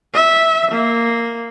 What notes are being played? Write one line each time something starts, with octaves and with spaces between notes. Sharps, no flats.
E5
A#3